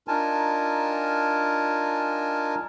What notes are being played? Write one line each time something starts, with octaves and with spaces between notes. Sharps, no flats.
D4 D#4 F4 A#4 G#5 A5